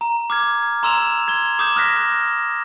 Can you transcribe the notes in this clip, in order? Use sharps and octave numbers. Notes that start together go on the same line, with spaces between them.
A#5
D6 F6 G#6
A#5 C6 E6 E7 F7
G#6 G7
D6 D#6 G6 E7
D#6 F6 F#6 A#6 B6